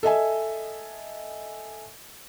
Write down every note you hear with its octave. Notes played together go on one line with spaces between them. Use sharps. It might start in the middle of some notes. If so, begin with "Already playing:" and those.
A4 D#5 E5 G#5